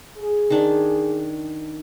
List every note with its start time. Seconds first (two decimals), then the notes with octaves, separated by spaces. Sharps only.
0.18 G#4
0.50 D#3 D4